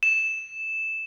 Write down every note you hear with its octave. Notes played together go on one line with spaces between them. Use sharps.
E7